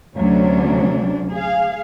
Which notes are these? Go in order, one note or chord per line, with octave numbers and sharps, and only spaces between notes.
D2 C3 F#3 C#4 D4
G#4 F5